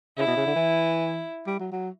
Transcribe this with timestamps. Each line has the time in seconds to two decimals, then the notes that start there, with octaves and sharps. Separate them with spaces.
0.17 C#3 E4
0.27 B2
0.36 C#3
0.46 D3
0.56 E3
1.47 G3
1.60 F#3
1.72 F#3